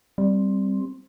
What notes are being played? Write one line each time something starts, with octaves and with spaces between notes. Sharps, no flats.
G3 C4